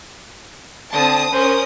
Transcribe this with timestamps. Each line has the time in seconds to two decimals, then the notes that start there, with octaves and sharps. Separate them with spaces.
0.94 D3 C4 A5 D#6
1.33 C#4 A#4 C5 D#6